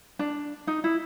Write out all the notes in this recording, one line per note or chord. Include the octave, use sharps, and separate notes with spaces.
D4
D#4
E4